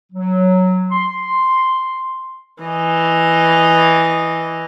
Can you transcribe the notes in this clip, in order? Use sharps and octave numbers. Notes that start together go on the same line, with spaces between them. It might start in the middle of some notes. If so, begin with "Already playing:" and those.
F#3
C6
E3 D#5